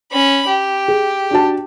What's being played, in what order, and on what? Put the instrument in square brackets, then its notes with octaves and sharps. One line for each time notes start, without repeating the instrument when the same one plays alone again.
[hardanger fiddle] C#4 B5
G4
[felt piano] G#4
D4 F#4 A5